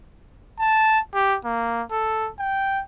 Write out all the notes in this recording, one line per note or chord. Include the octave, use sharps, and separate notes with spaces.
A5
G4
A#3
A4
G5